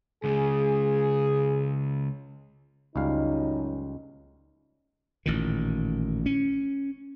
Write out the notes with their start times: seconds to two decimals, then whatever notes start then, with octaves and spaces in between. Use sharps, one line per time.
0.24 C#2 C#3 G#4
2.96 C#2 F#2 G3 D#4 F5
5.26 A1 A#2 D#3
6.26 C#4